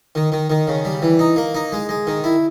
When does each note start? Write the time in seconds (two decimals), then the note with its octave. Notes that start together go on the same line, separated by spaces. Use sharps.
0.15 D#3
0.32 D#3
0.50 D#3
0.67 C#3
0.85 G3
1.02 E3
1.19 D#4
1.36 A#3
1.54 D#4
1.72 G#3
1.89 G#3
2.07 D#3
2.24 E4